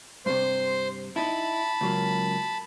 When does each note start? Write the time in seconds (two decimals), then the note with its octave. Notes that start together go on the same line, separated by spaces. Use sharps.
0.26 G2 C3 C5 C6
1.16 D#4 E4 A5 B5
1.81 C#2 F#3 A#3